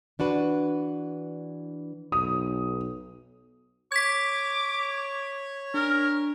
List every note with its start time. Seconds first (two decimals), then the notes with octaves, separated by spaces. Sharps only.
0.19 E3 D4 F#4 B4
2.12 B1 D#6
3.92 C#5 D6 G#6 B6
5.74 D4 A#4 F6